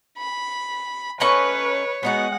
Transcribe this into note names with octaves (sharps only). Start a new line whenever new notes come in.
B5
A3 C#4 B4 C#5 D#5 A#5 B5 C#6
G#3 B3 D#4 F#4 F#5